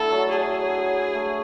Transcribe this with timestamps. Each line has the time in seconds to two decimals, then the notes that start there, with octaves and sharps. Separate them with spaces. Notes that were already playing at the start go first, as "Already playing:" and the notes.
Already playing: A3 D4 E4 F#4 A4
0.12 F#3
0.32 F#3 G#4
1.15 A3